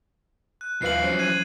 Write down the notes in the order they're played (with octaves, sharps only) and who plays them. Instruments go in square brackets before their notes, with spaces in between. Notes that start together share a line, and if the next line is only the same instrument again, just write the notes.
[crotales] F#6
[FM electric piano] D#2 B4 F5 [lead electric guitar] F3 E4 [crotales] C7 F#7
[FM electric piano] F#3 C#4 C5
[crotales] F#6 G#6 D#7